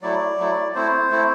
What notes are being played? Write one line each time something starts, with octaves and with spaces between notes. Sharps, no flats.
F#3 A3 E4 D5
F#3 A3 E4
A3 C4 E4 C5
A3 C4 E4